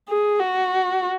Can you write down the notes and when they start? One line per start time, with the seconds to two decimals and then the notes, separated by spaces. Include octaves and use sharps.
0.09 G#4
0.40 F#4